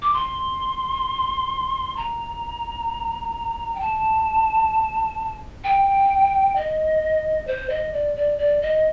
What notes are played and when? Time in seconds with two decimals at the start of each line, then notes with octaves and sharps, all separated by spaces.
0.02 D6
0.14 C6
1.97 A#5
3.75 G5
3.80 A5
5.64 G5
6.56 D#5
7.47 C5
7.70 D#5
7.93 D5
8.16 D5
8.38 D5
8.62 D#5